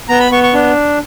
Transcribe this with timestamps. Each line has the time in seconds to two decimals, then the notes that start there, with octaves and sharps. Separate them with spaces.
0.09 B3 A#5
0.20 B5
0.32 B3 C#6
0.43 C#6
0.54 D4